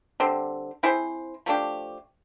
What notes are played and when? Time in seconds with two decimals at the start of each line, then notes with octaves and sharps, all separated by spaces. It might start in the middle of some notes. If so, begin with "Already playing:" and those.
0.20 D3 G3 C4
0.83 C4 E4 G#4 C5
1.46 F3 A3 D4 G4